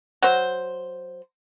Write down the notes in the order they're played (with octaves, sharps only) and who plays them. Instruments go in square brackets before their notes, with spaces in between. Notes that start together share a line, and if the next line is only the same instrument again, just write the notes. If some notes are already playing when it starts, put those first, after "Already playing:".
[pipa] F#3 C5